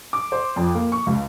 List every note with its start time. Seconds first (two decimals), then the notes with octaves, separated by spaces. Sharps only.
0.13 D6
0.32 C5
0.56 F2
0.75 A#3
0.92 C#6
1.06 C#2